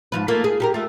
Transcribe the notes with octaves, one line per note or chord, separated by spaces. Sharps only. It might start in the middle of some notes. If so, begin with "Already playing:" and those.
G#2 F3 B4
A3 A#3 F4
G#4
G4 A4 A#4
A3 F4